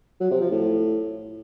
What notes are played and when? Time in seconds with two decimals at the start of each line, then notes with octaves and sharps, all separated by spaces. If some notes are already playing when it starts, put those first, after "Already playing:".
0.20 F#3
0.31 C3
0.41 F3
0.51 A2